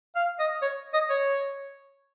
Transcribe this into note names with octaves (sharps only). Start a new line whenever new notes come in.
F5
D#5
C#5
D#5
C#5